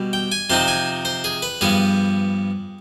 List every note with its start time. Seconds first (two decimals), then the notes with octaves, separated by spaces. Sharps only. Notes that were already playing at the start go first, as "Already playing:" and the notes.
Already playing: B2 G3
0.13 G5
0.32 G#5
0.50 C3 F3 C4 D#4 C6
0.68 G#5
1.05 C5
1.24 G#4
1.42 B4
1.61 G2 F3 B3 G#4